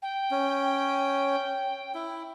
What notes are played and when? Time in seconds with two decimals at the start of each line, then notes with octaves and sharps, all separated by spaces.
0.02 G5
0.31 C#4
1.95 E4